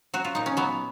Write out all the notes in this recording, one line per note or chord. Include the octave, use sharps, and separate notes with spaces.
F#3 F#4
F4
A#2 D#4
C#4
F#3 B3